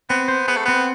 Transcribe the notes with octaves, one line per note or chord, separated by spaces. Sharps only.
B3 C4
C5
B3 G#4
A3
B3 C4